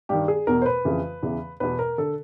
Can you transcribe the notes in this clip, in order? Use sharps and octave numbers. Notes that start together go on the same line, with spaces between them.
G2 D#3 G4
G#4
E2 B2 A#4
C5
B4
F2 C#3 E3
E2 C#3 E3
E2 B2 B4
A#4
D3 A4